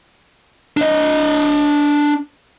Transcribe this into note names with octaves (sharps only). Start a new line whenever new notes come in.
D4 D#5